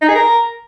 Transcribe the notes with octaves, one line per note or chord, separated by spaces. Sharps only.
D#4
G#4
A#4